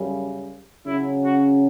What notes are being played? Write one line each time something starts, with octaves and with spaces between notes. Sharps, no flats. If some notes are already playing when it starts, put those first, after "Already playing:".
Already playing: F#2 C#3 G3
C#3 F#3 C#4 E4
F#4